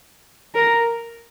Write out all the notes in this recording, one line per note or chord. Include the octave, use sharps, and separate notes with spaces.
A#4